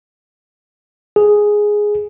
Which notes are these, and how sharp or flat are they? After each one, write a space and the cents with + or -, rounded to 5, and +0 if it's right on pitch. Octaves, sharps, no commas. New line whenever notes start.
G#4 +0